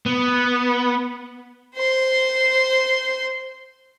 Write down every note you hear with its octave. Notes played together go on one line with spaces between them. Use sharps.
B3
C5 C6